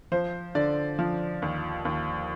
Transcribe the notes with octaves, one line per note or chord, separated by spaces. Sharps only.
F3 C5
D3 D5
F3
D#2
D#2